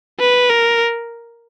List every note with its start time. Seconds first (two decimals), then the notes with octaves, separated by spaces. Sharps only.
0.19 B4
0.49 A#4